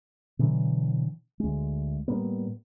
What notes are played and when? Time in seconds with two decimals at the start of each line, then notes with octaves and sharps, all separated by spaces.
0.39 B2 D3 E3 F#3
1.40 D2 G#3
2.08 A2 G3 A#3 B3